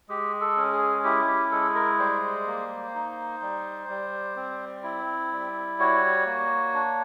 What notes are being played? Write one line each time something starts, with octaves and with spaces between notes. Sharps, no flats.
G#3 G4
A4
C#4
G#4
E4 G4
G4
G#3 A4
A#4
G3 C5
A#3
D#4
G3
G3
C4
E4
G3
F#4 C#5
A#3
D4